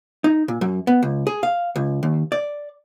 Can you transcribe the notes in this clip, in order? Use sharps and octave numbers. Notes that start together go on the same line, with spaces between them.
D#4
A#2
F#2
B3
C#2
G#4
F5
C#2
D#2
D5